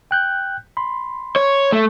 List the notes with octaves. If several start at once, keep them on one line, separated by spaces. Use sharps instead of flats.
G5 F#6 G6
B5 C6
C#5
A3